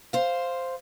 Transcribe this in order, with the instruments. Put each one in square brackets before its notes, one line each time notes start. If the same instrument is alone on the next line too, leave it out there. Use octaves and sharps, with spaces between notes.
[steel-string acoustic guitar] C5 F5